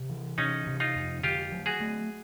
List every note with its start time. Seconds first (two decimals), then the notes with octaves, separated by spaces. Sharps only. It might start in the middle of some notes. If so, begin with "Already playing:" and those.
Already playing: C3
0.09 E3
0.38 C3 C#4 D#4
0.67 C3
0.80 D#4 F4
0.96 F2
1.23 D3 F4 G4
1.52 F#3
1.66 F#4 G#4
1.80 A3